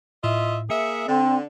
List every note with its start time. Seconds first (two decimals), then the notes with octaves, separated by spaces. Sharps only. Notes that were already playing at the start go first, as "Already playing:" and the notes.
0.24 A2 F4 D#5 E5
0.70 A#3 G#4 E5 C#7
1.08 D3 C4 D5